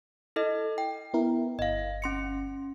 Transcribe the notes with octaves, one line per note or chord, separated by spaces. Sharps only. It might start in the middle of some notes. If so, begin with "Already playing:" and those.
E4 A4 D#5
G5
B3 E4 A#4
G1 D#5 F5
C#4 C6 C#7